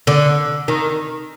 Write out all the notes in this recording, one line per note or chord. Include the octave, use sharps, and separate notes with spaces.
D3
D#3